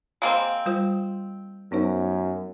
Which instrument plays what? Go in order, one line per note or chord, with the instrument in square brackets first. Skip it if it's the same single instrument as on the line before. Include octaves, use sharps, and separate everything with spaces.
[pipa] G#3 A#3 C4
[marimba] G3 F4 C5
[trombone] F#2 [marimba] B3 D#4 C5